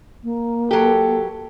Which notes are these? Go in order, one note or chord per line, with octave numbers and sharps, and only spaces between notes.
A#3
F#3 G4 A4